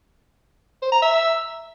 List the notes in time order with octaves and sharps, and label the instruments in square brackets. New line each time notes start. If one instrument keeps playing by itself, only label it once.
[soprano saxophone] C5
A#5
E5